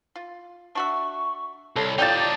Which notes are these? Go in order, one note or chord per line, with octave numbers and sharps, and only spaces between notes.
F4
D4 F#4 E5 C#6
C2 A4 C#5
D#4 F4 G4 D5 G5 A5 G6 A6